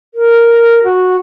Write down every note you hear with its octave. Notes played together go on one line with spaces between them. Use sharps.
A#4
F#4